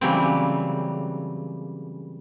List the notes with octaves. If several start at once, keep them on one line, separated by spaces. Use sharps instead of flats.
C#3 E3 F#3 G3 A#3 C4